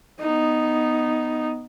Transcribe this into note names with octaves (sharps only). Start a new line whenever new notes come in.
B3 D#4